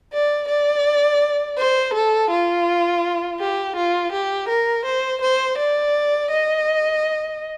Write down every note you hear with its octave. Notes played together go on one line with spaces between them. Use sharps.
D5
D5
C5
A4
F4
G4
F4
G4
A#4
C5
C5
D5
D#5